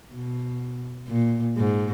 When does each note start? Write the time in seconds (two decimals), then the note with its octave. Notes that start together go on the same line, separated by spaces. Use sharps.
0.13 B2
1.08 A#2
1.57 G#2